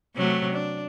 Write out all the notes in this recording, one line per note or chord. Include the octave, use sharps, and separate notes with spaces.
C3 F#3 A3
D4